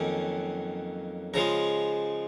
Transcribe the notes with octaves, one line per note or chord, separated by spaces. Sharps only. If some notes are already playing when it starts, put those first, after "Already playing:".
Already playing: F2 D#3 F#3 A#3 C#4
C#3 F3 G#3 A#5